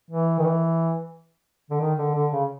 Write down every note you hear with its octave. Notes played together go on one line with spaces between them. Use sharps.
E3
D#3
E3
D3
D#3
D3
D3
C#3